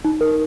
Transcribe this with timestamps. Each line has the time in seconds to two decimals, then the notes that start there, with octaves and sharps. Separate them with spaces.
0.04 D#4
0.21 A#4